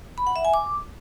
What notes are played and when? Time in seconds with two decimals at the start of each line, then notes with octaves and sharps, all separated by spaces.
0.18 B5
0.27 F#5
0.36 E5
0.45 G#5
0.54 D6